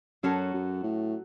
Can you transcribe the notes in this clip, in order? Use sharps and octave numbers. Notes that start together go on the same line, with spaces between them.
F#2 F#3 C#4 F#4 A4
F#2
A2